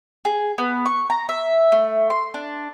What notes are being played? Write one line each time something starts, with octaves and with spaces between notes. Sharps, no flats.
G#4
B3
C#6
A#5
E5
A3
C6
D4